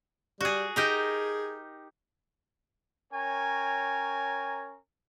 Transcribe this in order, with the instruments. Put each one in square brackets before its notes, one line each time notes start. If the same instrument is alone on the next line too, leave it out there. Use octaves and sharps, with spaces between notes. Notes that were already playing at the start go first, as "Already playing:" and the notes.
[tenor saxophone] G3 [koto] F#4 G#4
[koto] D#4 G4 A#4 [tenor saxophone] G#4
[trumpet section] C#4 A#4 C#5 G5 G#5 A#5